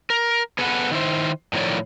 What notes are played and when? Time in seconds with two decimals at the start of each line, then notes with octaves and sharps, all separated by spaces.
0.10 A#4
0.59 B3 G#4 A4 B4 D5 F#5
0.91 D#3 E4 C5
1.53 A2 D#3 F3 C#5 D5